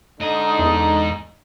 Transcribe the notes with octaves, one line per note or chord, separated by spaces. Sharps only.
G#2 D3 D#4 D#5
E2